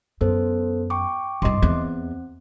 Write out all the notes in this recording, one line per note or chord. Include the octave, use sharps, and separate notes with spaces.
F#2 B3 A4 C5
G5 C#6 D6
C2 G2 D#5 C6 D6
E2 C4